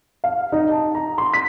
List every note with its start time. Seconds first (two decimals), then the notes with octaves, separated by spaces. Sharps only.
0.24 F5
0.52 D#4
0.70 A5
0.95 A#5
1.18 C6
1.34 B6